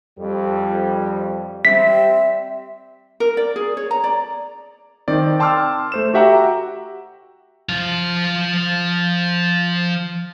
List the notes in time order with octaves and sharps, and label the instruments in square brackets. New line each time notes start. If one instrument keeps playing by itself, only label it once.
[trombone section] F2 G3
[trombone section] G3 C4 [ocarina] E5 [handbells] B6
[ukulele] A#4
D5
G#4
C#5
A#5
D5
[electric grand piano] D#3 C4 D5
G5 A5 C6 D6 E6 F6
A3 C5 E7
F#4 G4 E5 F#5 G5 A#5
[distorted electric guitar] F3 F5